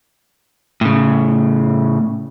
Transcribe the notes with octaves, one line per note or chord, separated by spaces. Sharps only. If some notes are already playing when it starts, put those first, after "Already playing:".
A2 C#3